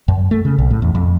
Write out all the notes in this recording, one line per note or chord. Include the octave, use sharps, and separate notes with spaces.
F#2
A3
C#3
B1
A2
E2
F2